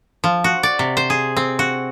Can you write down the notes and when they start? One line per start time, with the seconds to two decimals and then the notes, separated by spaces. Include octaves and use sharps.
0.24 F3
0.44 F#4
0.63 D5
0.79 C3
0.97 C5
1.10 G#4
1.37 C4
1.59 F#4